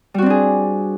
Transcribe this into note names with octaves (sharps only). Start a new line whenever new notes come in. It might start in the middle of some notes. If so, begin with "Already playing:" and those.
G3 C4 D4 F#4 G#4